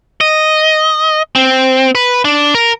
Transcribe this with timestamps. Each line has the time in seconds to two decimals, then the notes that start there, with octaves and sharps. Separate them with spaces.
0.21 D#5
1.35 C4
1.95 B4
2.25 D4
2.55 A#4